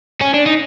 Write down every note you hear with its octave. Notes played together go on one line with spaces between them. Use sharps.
C#4
D4
D#4